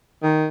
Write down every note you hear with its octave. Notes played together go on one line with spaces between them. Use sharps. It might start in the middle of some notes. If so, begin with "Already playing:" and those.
D#3